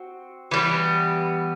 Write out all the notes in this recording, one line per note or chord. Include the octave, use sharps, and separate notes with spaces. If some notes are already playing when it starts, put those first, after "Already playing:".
Already playing: C4 F#4
E3 G3 B3